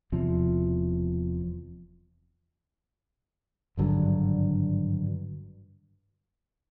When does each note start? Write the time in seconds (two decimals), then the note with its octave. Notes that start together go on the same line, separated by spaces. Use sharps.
0.12 E1 E2 C3 F3
3.77 G#1 G2 D3 F#3